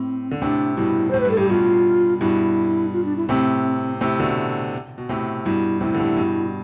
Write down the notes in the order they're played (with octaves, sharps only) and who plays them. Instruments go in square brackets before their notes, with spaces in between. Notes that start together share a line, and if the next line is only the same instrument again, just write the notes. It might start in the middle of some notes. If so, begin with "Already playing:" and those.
Already playing: [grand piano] A2 [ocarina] C4
[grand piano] D3
[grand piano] A2 C3 [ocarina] D4
[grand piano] G2 B2 [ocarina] E4
[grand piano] A2 [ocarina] C5
[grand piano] G2 [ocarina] B4
[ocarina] A4
[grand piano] G2 [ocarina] G4
[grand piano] G2 B2 [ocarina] F4
[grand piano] G2 B2 [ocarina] E4
[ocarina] F4
D4
E4
[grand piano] A2 C3 [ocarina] C4
[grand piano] A2 C3
B2 D3
B2
A2 C3
[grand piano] G2 B2 [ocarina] E4
[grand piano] A2 C3 [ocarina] E4
[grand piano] D3
A2 C3
G2 B2